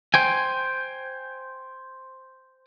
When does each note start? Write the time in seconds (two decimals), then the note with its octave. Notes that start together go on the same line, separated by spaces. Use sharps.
0.14 C5 G5 G#5